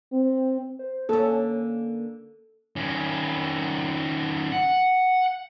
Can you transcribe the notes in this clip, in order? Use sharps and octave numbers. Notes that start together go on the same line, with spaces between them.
C4
C5
D3 A#3 C#4 A4
D#3 C#4
F#5